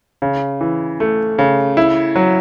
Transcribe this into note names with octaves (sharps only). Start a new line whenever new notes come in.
C#3
E3
A3
C#3
E4
F#3